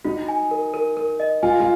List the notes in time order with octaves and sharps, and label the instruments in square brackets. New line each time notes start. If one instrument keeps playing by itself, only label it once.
[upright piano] D#4 [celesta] F#4
[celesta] G#5
A#4
A#4
A#4
D#5
[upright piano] F4 [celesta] G#5
[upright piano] F4